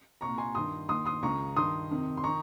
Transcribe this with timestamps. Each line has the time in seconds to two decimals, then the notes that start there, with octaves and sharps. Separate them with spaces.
0.21 C2 A#2 A#5 C#6
0.38 G#5 C6
0.55 G2 D#3 C6 D#6
0.88 D#2 D#3 C6 D#6
1.06 C6 D#6
1.22 C#2 C#3 A#5 C#6
1.56 G2 D#3 C6 D#6
1.90 F2 C3 D#3
2.17 C6
2.24 D#3 A#5 C#6